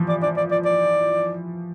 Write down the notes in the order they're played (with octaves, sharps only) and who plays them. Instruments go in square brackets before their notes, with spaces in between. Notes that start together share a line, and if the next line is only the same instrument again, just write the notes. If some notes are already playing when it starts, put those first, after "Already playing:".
Already playing: [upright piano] E3 F3
[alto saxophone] D5
D5
D5
D5
D5